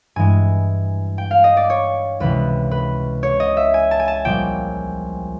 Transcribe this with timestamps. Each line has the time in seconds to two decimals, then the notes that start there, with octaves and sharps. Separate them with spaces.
0.16 G2 E3 G#3 G#5
1.18 G5
1.31 F5
1.44 D#5
1.57 D5
1.70 C#5
2.20 C#2 C3 E3 G#3 B4
2.71 B4
3.23 C#5
3.40 D#5
3.57 E5
3.74 G#5
3.91 A5
4.00 G#5
4.08 A5
4.25 A#1 A#2 G3 G5